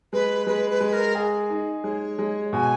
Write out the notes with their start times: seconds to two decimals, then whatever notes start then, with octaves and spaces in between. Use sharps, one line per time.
0.13 G#3 B4
0.47 G#3 B4
0.70 B4
0.80 G#3
0.93 A#4
1.15 G#4
1.50 D#4
1.83 G#3 C#5
2.19 G#3
2.52 B2 G#5